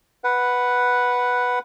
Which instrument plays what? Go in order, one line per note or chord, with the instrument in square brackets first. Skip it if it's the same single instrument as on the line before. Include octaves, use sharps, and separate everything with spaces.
[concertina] B4 F#5